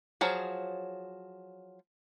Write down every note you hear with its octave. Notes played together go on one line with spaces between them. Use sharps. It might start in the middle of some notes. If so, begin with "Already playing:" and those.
F3 F#3 G#4